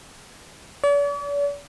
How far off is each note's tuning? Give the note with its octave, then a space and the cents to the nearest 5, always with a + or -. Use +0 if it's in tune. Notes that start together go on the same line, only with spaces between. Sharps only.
D5 -45